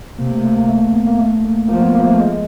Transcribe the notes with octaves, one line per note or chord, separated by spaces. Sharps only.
C3 A#3
A3
A#3
A3
A#3
A3
B3
A#3
A3
A#3
F3 A#3
B3
A#3
A3
G#3